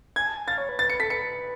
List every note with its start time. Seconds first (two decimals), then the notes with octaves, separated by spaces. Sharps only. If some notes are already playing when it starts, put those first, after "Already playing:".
0.16 G#5 G#6
0.27 A5
0.37 G#5
0.48 F5 A6
0.58 C#5
0.69 B4
0.79 B4 A6
0.89 B4 C#7
1.00 A4 B6
1.10 B4 C#7